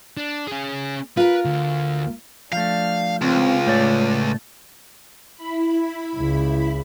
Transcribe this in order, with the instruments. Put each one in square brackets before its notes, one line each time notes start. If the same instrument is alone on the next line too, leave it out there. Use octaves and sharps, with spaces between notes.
[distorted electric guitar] D4
C#4 G#4
[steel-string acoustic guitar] F4 A#4 [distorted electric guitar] B4
[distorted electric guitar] D2
[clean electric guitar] F3 A3 [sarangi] D4 [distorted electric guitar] F5
[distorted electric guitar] C#2 [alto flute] C4 [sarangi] F4
[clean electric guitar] A2 A3 D5 [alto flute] C#5
[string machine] E4 B5
[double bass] C#2